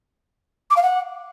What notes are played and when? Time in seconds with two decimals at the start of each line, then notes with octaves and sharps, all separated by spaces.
0.70 D6
0.76 F5
0.82 F#5